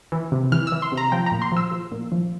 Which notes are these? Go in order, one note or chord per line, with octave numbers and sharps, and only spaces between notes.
E3
C3
E3 F6
E3 E6
C6
C3
A#5
F3 G5
A#5
A#2
C6
F3 E6
F3
A#2
F3